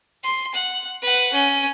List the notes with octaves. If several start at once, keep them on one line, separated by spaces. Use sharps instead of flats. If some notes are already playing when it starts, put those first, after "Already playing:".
C6
F#5
B4 F#5
C#4